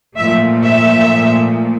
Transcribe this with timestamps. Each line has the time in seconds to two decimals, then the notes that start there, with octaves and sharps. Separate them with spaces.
0.17 A#2 F3 A3 E5
0.62 E5